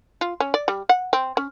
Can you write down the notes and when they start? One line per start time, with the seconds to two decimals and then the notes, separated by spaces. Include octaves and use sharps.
0.21 F4
0.40 C#4
0.54 D5
0.68 G3
0.89 F#5
1.13 C4
1.37 C#4